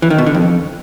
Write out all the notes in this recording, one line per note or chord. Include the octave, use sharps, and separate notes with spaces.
E3
D#3
B2
D3
F2